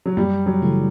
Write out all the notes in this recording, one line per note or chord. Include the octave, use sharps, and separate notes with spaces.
F#3
F#2 G3
F#3
C#3 E3 A3 E4